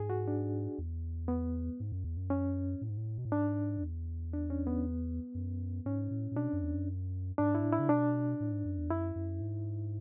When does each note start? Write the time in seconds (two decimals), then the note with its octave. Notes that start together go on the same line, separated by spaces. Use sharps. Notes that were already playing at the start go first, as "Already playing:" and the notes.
Already playing: G#2 G#4
0.10 F#4
0.28 D4
0.78 E2
1.28 B3
1.80 G#2
1.92 F#2
2.04 E2
2.17 F#2
2.30 C#4
2.81 A2
2.90 G#2
2.97 A2
3.18 B2
3.25 A2
3.31 G#2 D4
3.78 F#2
3.83 E2
4.33 D4
4.50 C#4
4.67 B3
5.35 F#2
5.85 G#2 C#4
6.11 A2
6.31 A2
6.36 B2 D4
6.53 F#2
6.62 E2
6.75 F#2
7.38 G#2 D4
7.55 E4
7.63 A2
7.72 E4
7.79 C#3
7.89 B2 D4
8.40 A2
8.52 G#2
8.65 F#2
8.78 E2
8.90 F#2 E4
9.15 F#2
9.41 G#2